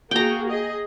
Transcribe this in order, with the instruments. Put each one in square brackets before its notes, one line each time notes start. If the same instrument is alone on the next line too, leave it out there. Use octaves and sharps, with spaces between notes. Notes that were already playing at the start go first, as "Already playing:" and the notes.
[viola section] A#3 F#4 G#4 [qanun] G5 A#5
[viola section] G#4 D#5